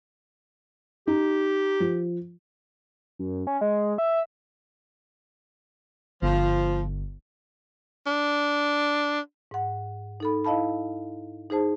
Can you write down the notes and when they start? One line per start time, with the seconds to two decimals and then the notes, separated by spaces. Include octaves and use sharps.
1.07 D#4 G4
1.80 F3
3.19 F#2
3.47 C#4
3.61 G#3
3.98 E5
6.22 G1 F3
8.06 D4
9.51 G#2 F#5
10.20 D#4 A4 B5
10.45 E4 D#5 F5 A5 B5
11.50 D#4 G#4 C5 A5